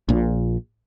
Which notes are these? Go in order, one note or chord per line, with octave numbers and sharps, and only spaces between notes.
A#1 A#2